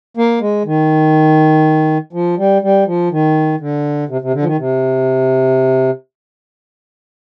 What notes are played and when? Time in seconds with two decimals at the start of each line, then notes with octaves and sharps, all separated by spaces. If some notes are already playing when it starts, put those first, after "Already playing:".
0.17 A#3
0.41 G#3
0.65 D#3
2.13 F3
2.38 G3
2.62 G3
2.86 F3
3.11 D#3
3.60 D3
4.09 C3
4.21 C3
4.33 D3
4.42 F3
4.46 D#3
4.58 C3